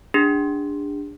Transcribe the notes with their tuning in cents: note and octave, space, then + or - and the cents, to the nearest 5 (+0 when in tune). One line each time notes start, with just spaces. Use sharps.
D4 +0 G#4 -40